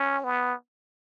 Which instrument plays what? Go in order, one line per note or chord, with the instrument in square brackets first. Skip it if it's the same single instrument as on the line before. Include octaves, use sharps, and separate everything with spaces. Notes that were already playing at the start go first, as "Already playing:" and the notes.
Already playing: [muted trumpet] C#4
B3